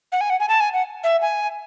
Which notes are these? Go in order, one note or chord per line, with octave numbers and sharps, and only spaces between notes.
F#5
G#5
F#5
G#5
A5
G#5
F#5
E5
G#5